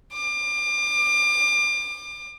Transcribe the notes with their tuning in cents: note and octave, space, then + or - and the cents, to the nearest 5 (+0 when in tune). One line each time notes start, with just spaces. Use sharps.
D6 +30